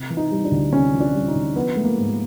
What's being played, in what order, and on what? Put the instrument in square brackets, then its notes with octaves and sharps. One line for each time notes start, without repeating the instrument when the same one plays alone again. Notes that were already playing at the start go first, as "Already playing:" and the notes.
Already playing: [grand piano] C3
E3
D#4
G3
D4
D2
C3 C#4
E3
D4
G3
D#4
D2
F3 B3
G#3 A3
A#3
G#2